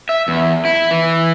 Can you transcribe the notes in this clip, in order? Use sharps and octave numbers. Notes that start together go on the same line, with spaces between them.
E5
E2
E4
E3